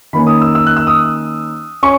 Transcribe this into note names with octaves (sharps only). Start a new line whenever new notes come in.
D#3 A#3 C#4 B5
D#6
E6
E6
F#6
E6
D#6
C#4 C#6